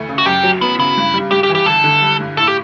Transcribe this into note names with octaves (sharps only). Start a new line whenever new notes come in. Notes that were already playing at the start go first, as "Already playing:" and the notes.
Already playing: D2 E3 A3
C#3
F#4
F#2 G4
F#3
B3 E4
C#3 E4
G2
G3
G2 G4
G4
E3
G4
G1 A4
D3
G3
G2
A2 A4
G4